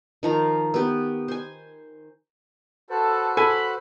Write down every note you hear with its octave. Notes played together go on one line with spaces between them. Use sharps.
D#3 F3 A#5
B3 G4
C5 G#5
F#4 A4 B4 C5
A4 G#5 B5